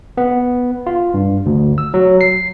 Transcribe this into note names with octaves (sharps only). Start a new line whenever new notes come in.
B3
F4
G2
D2
E6
F#3
C7